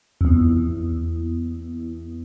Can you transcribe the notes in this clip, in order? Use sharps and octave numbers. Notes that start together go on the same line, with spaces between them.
F2
E2